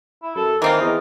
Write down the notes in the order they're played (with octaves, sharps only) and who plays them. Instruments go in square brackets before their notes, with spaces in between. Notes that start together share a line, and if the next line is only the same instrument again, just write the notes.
[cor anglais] E4
[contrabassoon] F#2 [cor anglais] A4
[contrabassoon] D#3 [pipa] E3 C4 F4 [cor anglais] A#3
[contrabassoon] E2 [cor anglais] D#5